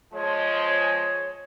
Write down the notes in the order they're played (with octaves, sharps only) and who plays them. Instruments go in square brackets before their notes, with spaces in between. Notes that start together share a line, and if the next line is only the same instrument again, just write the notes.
[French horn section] F3 G#3 [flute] C#5